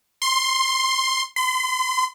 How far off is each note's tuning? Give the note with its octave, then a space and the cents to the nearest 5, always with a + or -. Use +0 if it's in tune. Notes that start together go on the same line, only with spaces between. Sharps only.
C6 +10
C6 -35